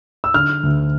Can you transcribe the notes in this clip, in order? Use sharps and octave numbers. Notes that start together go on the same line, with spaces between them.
E6
D3 F6
D2